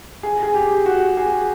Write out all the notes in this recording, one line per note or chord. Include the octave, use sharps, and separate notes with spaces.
G#4
G#4
G4
F#4
G#4